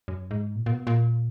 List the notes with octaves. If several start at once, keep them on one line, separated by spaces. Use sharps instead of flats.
F#2
G#2
A#2
A#2
B2
A#2